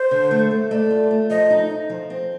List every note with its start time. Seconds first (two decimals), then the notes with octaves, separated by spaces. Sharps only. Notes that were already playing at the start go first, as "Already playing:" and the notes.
Already playing: C5
0.11 D3
0.31 A3
0.51 A3
0.71 A3 D5 D#5
0.91 F4
1.11 A3
1.30 F3 D#5
1.50 D#4
1.70 D#4
1.90 F3
2.10 C4